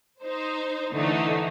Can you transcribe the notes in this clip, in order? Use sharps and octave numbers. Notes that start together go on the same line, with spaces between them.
D#4 C5
D3 E3 A3 D#4